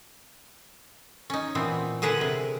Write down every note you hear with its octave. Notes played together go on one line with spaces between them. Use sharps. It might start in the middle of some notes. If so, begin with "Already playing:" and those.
C#4 D#4
A#2 E3 B3 C4
D3 G#4 A#4 B4 F#5
C3